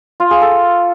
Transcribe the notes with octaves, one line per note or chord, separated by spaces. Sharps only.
F4
G#4
A4